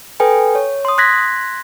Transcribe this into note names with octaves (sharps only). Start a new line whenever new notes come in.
A4 B4 G5 G#5
C#5
C6 D#6
C6 F#6 G#6 A#6 B6